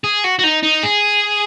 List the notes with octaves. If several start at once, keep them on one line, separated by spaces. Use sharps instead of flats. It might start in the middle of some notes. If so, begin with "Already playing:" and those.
G#4
F#4
F#4
D#4
D#4
G#4